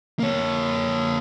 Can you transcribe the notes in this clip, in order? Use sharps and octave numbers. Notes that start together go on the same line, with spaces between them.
A#3 C#5